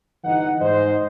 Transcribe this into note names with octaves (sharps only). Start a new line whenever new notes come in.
G1 E3 D#4 F#5
G#2 C5 D#5